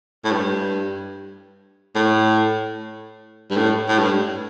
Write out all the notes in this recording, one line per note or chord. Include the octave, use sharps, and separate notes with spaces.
A2
G2
A2
G2
A2
A2
G2